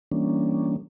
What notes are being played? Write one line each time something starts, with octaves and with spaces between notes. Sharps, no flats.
E3 G3 A#3 C#4 D4